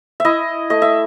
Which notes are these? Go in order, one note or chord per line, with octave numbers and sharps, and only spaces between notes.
E4 D#5 E5
A3 D#5
E5